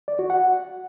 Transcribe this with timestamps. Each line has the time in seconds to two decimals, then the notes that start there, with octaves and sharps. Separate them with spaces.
0.08 D5
0.19 F#4
0.30 F#5